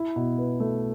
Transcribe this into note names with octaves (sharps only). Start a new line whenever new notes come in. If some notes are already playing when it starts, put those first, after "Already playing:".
Already playing: E4
B2
B4
A3